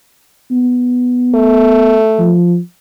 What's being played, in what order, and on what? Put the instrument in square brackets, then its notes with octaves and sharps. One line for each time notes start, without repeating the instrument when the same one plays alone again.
[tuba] B3
[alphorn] A3
[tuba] F3